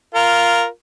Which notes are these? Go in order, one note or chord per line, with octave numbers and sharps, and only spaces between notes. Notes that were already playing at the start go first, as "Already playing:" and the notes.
F4 A#4